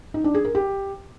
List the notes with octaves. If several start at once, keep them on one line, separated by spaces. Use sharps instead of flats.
D#4
D4
G#4
A#4
G4